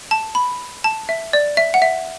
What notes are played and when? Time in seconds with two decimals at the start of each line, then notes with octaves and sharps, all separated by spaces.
0.11 A5
0.35 B5
0.84 A5
1.09 E5
1.33 D5
1.57 E5
1.74 F#5
1.82 E5